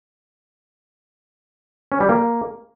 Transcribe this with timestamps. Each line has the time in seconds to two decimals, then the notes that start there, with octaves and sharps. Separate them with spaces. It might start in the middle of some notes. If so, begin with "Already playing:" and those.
1.92 C#4
2.00 G3
2.09 A#3